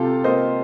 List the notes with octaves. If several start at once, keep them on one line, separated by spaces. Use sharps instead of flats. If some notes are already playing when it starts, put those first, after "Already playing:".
Already playing: C3 F4 G4 A4
A#3 C5 D#5